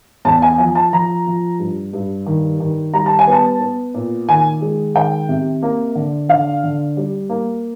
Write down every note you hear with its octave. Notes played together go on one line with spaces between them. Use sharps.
E2 A5
G#5
F3 G#5
A5
F3 A#5
F3
G2
G2
D#3
D#3
G3 A#5
A5
G#5
B3 A5
B3
A#2
D#3 G#5
G#3
D#3 G5
C3
A#3
D3
D3 F5
D3
G3
A#3